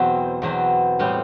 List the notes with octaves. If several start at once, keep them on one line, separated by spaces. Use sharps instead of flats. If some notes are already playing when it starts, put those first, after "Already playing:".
Already playing: E2 B2 F#3 C4
E2 B2 F#3 C4
A2 G3 C4